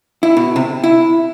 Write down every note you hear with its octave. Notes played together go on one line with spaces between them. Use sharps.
E4
B2
C3
E4